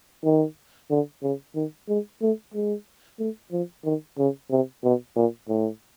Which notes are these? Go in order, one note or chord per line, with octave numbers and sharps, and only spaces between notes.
D#3
D3
C#3
D#3
G#3
A3
G#3
A3
F3
D#3
C#3
C3
B2
A#2
A2